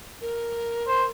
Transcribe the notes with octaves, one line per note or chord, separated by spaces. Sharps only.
A#4
C5